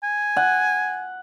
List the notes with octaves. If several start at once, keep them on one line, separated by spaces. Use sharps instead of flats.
G#5
F#5